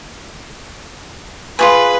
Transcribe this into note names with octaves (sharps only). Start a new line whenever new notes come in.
F4 F#4 G#4 B4